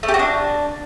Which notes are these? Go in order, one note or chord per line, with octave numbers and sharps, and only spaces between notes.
A3
G4
F#4
D4